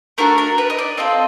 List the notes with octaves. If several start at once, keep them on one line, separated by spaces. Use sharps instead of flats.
A3 D4 F#4 A#4
A#4
B4
D#5
D5
C4 F4 A4 D#5